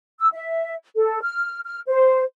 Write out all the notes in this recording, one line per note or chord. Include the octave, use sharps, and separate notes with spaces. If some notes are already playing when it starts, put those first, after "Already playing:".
E6
E5
A4
F6
F6
C5